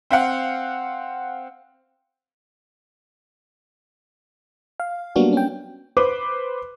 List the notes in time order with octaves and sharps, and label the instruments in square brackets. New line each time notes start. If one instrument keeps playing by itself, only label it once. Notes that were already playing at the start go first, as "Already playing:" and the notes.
[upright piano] C4 F5 F#5
[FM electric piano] F5
F#3 G3 A#3 B3 D4 F#4
C#4 G5
[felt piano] B4 C5 D6